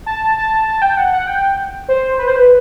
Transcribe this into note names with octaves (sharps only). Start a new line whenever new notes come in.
A5
A5
A5
G5
F#5
F#5
G5
C5
B4
C5
B4